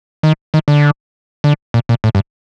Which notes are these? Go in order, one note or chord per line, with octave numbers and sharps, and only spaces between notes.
D#3
D#3
D3
D3
A#2
A#2
A2
G2